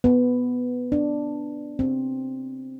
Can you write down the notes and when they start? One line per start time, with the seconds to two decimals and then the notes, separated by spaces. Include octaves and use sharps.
0.04 B3
0.92 D4
1.79 C4